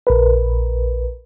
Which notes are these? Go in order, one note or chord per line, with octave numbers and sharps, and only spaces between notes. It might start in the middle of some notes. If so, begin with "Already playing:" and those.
A#1 A#4 B4